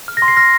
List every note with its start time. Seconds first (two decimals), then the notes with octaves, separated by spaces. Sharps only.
0.08 F6
0.17 A#6
0.22 C6
0.28 C7
0.37 F6 A#6